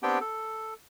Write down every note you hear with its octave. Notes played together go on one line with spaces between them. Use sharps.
B3 C4 D4 G4 G5
A4